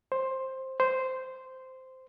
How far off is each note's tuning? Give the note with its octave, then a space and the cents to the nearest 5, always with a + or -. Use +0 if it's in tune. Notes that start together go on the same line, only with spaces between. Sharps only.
C5 +10
C5 -10